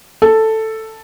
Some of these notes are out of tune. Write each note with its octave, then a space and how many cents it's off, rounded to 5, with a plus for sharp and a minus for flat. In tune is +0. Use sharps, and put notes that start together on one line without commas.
A4 +5